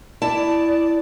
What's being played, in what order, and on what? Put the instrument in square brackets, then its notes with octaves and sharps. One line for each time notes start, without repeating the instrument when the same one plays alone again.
[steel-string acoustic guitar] E4 A5 [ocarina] D5